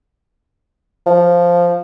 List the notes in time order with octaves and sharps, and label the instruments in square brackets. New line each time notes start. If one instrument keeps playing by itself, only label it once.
[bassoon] F3